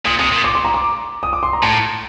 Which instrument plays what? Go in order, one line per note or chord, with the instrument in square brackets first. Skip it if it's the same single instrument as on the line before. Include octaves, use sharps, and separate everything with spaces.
[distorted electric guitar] A#2 [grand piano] D#6
[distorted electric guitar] C3 [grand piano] D#6
[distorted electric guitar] A#2
[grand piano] D6
C6
A#5
D6
D#6
D6
C6
A#5
[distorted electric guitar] A2 [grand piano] A5